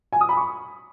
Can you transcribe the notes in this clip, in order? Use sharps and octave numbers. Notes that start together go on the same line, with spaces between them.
G#5
D#6
B5
C#6